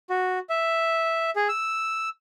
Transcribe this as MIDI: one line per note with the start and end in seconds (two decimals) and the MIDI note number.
0.10 0.39 66
0.49 1.30 76
1.36 1.48 68
1.49 2.09 88